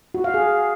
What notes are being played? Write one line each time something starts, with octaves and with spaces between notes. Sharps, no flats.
F#4
F5
G#4